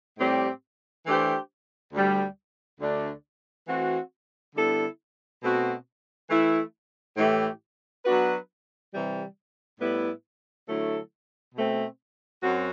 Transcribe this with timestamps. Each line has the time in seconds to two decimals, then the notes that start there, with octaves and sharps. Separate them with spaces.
0.18 A2 G3 C4 G4
1.06 E3 A3 D4 G4 C5
1.93 D2 D3 G3
2.80 D2 D3 A3 D4
3.68 E3 A3 C4 F#4
4.55 D3 G3 B3 E4 A4
5.42 B2 A3 C4 F#4
6.30 E3 A3 E4
7.17 A2 E3 A3 E4 G4
8.05 F#3 B3 D4 F#4 B4
8.92 C3 E3 G3
9.80 A2 G3 B3 E4 B4
10.67 D3 F#3 A3 E4 A4
11.55 B2 A3 C4
12.41 F#2 F#3 C4 F#4